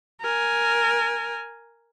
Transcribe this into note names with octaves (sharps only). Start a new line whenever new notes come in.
A#4 G#5